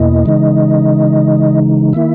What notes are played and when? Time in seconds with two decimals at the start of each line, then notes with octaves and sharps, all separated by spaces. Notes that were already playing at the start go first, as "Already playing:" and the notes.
Already playing: E2 B2 A#3 E4 D#5
0.25 C#3 E3 G#3 D#4
1.93 D#3 A#3 E4 E5